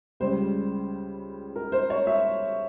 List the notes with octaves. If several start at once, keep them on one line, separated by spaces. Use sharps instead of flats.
C#2 C#3 G3 C5
A#4
C5
C#5
E5